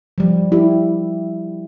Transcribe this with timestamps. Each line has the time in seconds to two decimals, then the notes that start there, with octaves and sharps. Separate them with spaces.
0.18 F3 G3
0.52 E4 G4